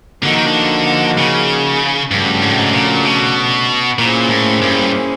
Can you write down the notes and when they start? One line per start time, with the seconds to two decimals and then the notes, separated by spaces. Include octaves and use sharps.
0.23 D3 F3 A#3 D#4 F#4
0.35 D#3
0.46 D3
1.18 C#3
2.11 G2 C#3 F3 A3 D4 F#4
2.42 G#2
2.51 A2
2.59 G#2
2.74 A#2
3.05 B2
3.99 A#2 A#3 C#4 E4 G#4 C5
4.29 A2
4.62 G2